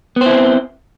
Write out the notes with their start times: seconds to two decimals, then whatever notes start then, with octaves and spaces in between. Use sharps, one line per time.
0.16 B3
0.21 C5
0.26 E4
0.30 C4